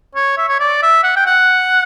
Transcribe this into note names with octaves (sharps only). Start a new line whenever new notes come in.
C#5
E5
C#5
D5
E5
F#5
G5
F#5